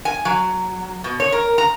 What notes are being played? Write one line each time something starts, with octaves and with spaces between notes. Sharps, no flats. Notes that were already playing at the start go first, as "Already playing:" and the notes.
G#5
F#3
B2
C#5
A#4
A#5